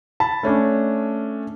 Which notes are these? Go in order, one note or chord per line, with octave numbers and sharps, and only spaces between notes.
A5 B5
A3 C#4 D4